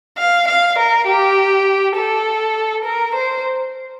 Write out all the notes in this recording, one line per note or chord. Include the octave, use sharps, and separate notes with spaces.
F5
F5
A#4
G4
A4
A#4
C5